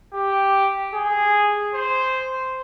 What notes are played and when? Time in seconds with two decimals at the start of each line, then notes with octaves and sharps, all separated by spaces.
0.13 G4
0.94 G#4
1.75 C5